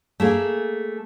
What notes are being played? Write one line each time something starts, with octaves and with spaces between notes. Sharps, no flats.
A3 A#3 G#4